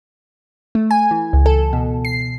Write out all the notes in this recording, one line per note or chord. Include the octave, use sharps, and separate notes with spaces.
A3
G#5
E3
C#2
A4
B2
C7